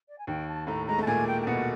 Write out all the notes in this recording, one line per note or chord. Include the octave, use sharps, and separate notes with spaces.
D5
G#5
D#2 D#3 G5
A5
A2 A3 A#5
G#3 A#5
A3 A5
A#2 A#3 G#5
G5
G5
B2 B3 F#5